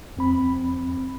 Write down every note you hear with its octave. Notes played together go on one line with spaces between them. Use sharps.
F2 C4 B5